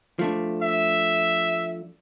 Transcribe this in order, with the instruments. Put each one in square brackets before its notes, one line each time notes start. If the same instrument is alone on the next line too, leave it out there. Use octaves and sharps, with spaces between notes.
[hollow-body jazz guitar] F3 A3 D4
[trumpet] E5